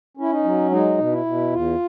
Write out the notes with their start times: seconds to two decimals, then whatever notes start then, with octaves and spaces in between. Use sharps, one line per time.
0.17 C#4 E4
0.31 D#4
0.44 F#3
0.71 G#3 D#4
0.98 B2
1.12 E4
1.25 B2
1.52 E2 F4